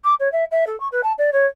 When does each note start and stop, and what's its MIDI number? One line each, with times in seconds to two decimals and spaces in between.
0.04 0.14 86
0.20 0.31 73
0.32 0.44 76
0.51 0.64 76
0.67 0.78 69
0.80 0.88 85
0.92 1.01 71
1.03 1.12 81
1.18 1.30 74
1.33 1.46 73